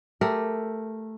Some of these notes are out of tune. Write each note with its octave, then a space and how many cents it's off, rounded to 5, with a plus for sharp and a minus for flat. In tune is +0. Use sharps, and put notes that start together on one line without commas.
A3 +0 G4 +0 A#4 -5